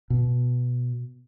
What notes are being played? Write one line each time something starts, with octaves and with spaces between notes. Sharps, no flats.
B2